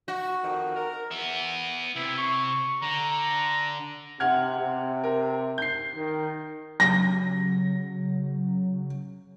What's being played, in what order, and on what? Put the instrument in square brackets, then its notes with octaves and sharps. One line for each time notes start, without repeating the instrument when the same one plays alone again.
[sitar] F#4
[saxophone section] F2 D#3
A#4
[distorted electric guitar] B3 E5
[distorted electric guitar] C3 [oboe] E4
[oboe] C#6
[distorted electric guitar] D3 [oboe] A#5
[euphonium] C3 [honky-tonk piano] F#5 F6 G#6
[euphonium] C3
[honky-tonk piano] A#4
G6 C7
[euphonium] D#3
[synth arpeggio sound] C#3 F#3 [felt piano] A#6